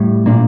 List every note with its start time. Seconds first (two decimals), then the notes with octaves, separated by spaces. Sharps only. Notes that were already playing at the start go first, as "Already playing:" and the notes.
Already playing: A2 G3
0.26 A#2 A#3 D4